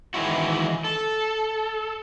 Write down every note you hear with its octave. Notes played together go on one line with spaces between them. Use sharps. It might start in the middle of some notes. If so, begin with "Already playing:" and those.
D#3 E3 G#3 E4 F#4
A4